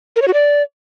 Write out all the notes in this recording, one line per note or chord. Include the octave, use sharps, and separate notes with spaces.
A#4
C#5
F#4
D5